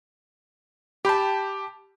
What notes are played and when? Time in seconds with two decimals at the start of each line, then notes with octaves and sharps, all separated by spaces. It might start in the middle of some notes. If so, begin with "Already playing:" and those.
1.05 G4 G5 A5 B5